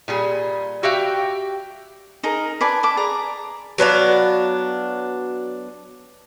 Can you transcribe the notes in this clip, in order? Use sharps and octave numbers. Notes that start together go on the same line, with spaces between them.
A#2 G3 G#4
F#4 G4 E5 F5 G5
D#4 G#4 A#4
B4 D5 G#5 A5
B4 A5 D6
G#4 D5 A#5
F#3 B3 D4 F5